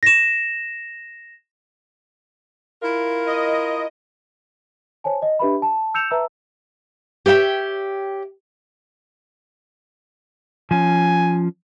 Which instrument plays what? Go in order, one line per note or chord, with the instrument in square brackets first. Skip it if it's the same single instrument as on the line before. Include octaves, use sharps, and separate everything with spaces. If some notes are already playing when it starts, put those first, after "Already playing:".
[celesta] A#6 E7
[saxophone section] E4 F4 A#4
[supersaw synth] D#5
[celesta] C5 C#5 G#5 A5
D#5
D4 G4 B4 E5 B5
A5
E6 G6 C#7 E7 F7
B4 E5 A5 A#5 E6
[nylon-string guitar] G4 C#5 E5 G5
[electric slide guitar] F3 C#4 [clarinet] G#5